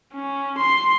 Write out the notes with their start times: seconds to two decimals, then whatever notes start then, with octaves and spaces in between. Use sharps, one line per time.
0.14 C#4
0.58 C6